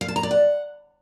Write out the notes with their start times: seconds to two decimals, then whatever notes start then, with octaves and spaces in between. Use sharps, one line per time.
0.01 F5
0.08 A5
0.16 A#5
0.23 D5
0.31 F#5